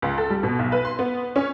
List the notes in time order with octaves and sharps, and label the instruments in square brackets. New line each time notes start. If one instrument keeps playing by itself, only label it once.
[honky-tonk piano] C#2
A4
G3
B2
B1
B4
C6
B3
C#4